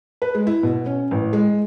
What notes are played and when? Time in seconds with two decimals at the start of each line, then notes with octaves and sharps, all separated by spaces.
0.22 B4
0.35 G#3
0.47 E4
0.63 B2
0.86 C#4
1.11 A1
1.33 G#3